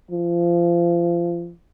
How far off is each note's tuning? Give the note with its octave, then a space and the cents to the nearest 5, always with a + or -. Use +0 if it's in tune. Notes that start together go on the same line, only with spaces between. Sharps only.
F3 -25